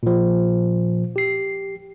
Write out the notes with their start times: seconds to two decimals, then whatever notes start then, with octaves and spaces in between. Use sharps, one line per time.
0.03 A#2 F3
1.16 G4 C7